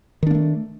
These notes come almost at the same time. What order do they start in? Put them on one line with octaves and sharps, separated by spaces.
D#3 D4 A#3 A3